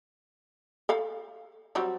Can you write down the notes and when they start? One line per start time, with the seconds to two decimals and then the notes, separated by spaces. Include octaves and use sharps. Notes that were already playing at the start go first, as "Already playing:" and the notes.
0.89 A4 F5 B5
1.75 F#3 G3 C4